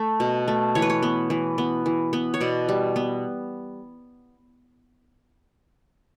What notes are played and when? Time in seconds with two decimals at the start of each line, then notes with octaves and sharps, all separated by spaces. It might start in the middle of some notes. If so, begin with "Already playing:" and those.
Already playing: A3
0.20 B2
0.48 A3
0.75 E3 C#5
0.82 B4
0.90 C#5
1.03 B3
1.30 E3
1.58 B3
1.86 E3
2.13 B3
2.34 C#5
2.41 B2 D5
2.69 G3
2.96 B3